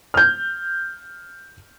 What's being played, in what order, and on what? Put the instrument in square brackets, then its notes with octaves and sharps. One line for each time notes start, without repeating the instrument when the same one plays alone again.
[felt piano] F6 G6